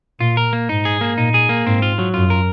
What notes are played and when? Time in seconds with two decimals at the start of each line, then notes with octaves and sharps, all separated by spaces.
0.20 A#2 F4
0.37 A#4
0.53 A#3
0.69 G#2 D#4
0.85 G#4
1.01 A#3
1.18 A#2 D#4
1.34 G#4
1.49 A#3
1.66 G#2 C4
1.82 F4
1.99 F#3
2.14 F#2 F4
2.30 A#4